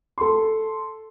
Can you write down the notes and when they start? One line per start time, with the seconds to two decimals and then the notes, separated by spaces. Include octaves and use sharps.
0.18 A4 C6